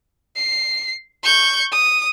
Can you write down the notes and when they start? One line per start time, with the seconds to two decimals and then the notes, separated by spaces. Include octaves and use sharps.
0.36 C7
1.24 C#6 G6
1.72 D#6